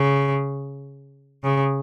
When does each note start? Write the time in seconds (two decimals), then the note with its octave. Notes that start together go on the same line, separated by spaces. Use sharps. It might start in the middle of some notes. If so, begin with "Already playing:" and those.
Already playing: C#3
1.43 C#3